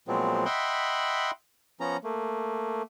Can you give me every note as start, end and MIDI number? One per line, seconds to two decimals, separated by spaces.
0.08 0.45 46
0.08 0.45 53
0.08 0.45 54
0.08 0.45 56
0.08 0.45 59
0.08 0.45 60
0.45 1.31 75
0.45 1.31 76
0.45 1.31 78
0.45 1.31 79
0.45 1.31 83
0.45 1.31 84
1.80 1.97 53
1.80 1.97 59
1.80 1.97 61
1.80 1.97 82
2.04 2.82 57
2.04 2.82 58